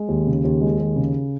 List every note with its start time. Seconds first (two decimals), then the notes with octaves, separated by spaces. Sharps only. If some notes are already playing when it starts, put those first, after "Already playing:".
Already playing: G#3
0.08 D#2
0.27 C#3
0.44 D#2
0.61 G#3
0.80 D#2
0.96 C#3